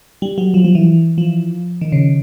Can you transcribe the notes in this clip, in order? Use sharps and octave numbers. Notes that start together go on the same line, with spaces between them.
G3
F#3
F3
F3
E3
F3
D#3
C#3